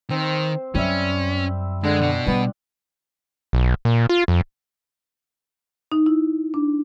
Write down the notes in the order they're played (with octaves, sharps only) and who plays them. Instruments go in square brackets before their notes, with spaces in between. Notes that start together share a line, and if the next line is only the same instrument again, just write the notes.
[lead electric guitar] D#3 [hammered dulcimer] C4
[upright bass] F#2 [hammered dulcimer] G3 E5 [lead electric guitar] C#4
[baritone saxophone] D3 [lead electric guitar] G#3 [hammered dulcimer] D4
[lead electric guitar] B2 F#5
[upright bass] G3 [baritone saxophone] B3
[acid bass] B1
A#2
F4
F2
[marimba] D#4
E4
D4